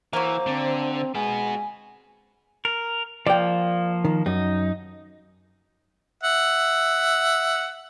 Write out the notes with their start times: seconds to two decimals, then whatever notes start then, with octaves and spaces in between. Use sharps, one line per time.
0.13 E3 F#3 A#3 C5
0.47 D3 C4
1.15 G#3 B3 F#4 G#5
2.65 A#4
3.27 F3 A#3 D5 G5
4.05 D#3
4.26 F#2 D#4
6.23 E5 F#5